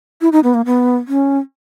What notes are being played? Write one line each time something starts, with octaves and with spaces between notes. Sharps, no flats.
E4
D#4
B3
A#3
B3
C#4